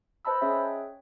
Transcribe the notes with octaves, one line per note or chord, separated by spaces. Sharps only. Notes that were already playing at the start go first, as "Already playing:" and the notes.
B4 C5 D#5 A5 B5 E6
C#4 G#4 C#5 E5 G5